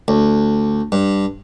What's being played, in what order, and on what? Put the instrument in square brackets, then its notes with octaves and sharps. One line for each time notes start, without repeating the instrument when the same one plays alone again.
[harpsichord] D2
G2